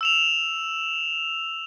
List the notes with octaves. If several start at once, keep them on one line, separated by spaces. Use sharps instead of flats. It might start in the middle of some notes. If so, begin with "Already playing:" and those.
E6 E7 F7